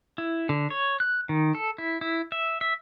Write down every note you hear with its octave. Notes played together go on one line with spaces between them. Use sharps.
E4
D3
C#5
F#6
D#3
A4
E4
E4
E5
E5